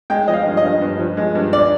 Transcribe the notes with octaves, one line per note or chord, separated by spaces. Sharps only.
G#3 G5
F3 D#5
F5
G2
D#5
G2
G2
F3
G#3
G2
D5